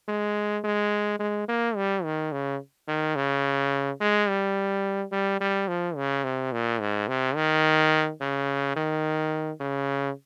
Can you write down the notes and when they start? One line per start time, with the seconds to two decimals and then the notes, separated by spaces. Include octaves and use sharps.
0.08 G#3
0.64 G#3
1.20 G#3
1.48 A#3
1.76 G3
2.04 D#3
2.32 C#3
2.88 D#3
3.16 C#3
4.01 G#3
4.28 G3
5.12 G3
5.41 G3
5.68 F3
5.96 C#3
6.24 C3
6.52 A#2
6.80 G#2
7.08 C3
7.36 D#3
8.21 C#3
8.76 D#3
9.61 C#3